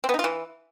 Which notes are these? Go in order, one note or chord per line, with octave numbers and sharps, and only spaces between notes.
C4
B3
D#4
F4
E3